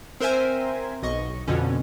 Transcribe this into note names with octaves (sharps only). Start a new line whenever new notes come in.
C4 A#4 C5 E5 G#5
B1 D#5 C#6
F2 B2 D3 C#4